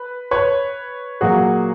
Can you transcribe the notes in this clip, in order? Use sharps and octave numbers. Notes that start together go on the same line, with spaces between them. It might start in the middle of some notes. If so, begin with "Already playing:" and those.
Already playing: B4
B4 C#5
A#2 F#3 A#3 F#4 G#4